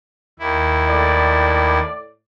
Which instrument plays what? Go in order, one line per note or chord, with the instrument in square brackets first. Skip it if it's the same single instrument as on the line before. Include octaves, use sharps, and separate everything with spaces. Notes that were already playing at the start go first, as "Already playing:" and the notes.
[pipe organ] D#2 E4
[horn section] A2 D5